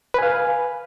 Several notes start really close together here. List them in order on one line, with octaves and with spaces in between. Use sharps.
B4 G#5 F5